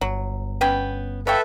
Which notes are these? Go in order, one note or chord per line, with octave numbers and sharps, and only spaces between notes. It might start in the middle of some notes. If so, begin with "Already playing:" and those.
G1 F#3
B3 C#4 G5
A4 B4 C#5 E5 F5 G5